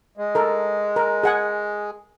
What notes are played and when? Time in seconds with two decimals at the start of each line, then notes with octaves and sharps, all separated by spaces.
0.17 G#3
0.35 A4 A#4
0.96 A#4
1.23 G#4 F#5 G#5